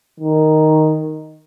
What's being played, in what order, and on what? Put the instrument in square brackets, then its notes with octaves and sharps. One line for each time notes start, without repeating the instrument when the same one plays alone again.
[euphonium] D#3